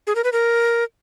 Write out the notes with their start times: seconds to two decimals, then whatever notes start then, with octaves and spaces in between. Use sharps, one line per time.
0.07 G#4
0.16 A#4
0.24 B4
0.33 A#4